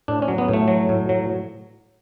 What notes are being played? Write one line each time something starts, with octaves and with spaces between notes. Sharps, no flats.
A2 D4
C#4
F#3
B3
A2
A3
F#3
A2
F#3